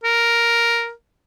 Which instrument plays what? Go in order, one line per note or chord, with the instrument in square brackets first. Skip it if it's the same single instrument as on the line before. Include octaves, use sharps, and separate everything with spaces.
[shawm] A#4